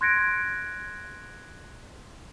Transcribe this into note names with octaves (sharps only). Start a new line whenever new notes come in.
C6 F#6 G#6 A#6 C#7 D7